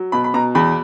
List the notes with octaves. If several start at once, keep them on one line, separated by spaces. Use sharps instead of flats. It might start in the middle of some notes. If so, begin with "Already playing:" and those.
Already playing: F#3
B2 B5
B5
B2 A#5
E2 B5